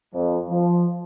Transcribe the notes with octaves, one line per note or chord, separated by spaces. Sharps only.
F2
F3